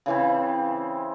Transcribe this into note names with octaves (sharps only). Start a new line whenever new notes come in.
C#3 E3 C4